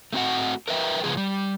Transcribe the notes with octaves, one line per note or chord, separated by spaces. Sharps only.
A3 C4 F#4 F#5
A#4 B4 E5 G5
C#3 F3 G#3 B3 G#4
G3